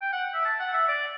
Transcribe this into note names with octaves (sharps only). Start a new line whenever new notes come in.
G5
F#5
E5
A5
F#5
E5
D5